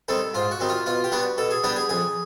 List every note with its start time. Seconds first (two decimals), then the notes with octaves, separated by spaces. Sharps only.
0.08 D#3 G3 C4 A4
0.34 G#2 F4
0.51 F#4
0.60 D#3 G3 C4
0.69 F4
0.86 B2 F4
1.04 G4
1.11 G3 B3 D4 F#4
1.38 B2 A4
1.51 G#4
1.64 G3 B3 D4 G4
1.76 G#4
1.89 F2 G#4